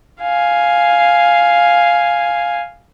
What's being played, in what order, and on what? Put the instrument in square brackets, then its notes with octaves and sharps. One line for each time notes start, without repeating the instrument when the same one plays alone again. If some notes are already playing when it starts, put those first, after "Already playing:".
[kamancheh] F5 G#5